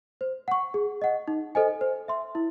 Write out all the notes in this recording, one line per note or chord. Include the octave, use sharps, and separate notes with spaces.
C5
F#5 C#6
G#4
D#5 F#5
D#4
A4 C5 D#5 G#5
C5
E5 C6
E4